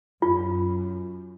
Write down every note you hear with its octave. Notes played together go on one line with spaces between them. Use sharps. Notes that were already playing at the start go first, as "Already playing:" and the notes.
F#2 F4